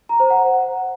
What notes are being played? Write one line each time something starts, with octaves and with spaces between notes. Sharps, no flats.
A#5
C5
F#5